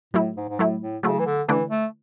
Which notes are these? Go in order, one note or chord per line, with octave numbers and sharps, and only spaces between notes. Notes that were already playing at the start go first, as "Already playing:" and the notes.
A2 F#3 A3 E4
G#2
G#2
A2 F#3 A3 E4
A2
C#3 F#3 A3 E4
E3
D3
D3 E3 A3 E4 B4 D5
A3